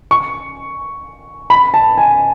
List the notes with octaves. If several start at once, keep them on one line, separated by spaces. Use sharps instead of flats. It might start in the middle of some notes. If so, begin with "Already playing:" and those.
C#6
B5
A5
G#5